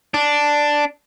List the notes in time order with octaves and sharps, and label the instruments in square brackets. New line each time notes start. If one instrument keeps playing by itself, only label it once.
[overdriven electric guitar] D4